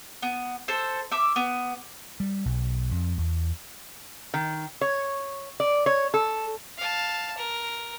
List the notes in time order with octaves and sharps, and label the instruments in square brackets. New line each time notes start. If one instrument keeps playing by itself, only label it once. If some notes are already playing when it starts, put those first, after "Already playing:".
[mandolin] B3
A4 C5
E5 D6
B3
[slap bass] G3
B1
F2
E2
[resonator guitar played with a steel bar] D#3
C#5
D5
C#5
A4
[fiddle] F5 A5
A#4